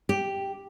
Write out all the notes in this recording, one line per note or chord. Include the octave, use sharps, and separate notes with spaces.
G4